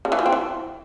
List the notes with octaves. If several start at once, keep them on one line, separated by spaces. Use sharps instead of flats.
C#3
E3
F3
C4
E3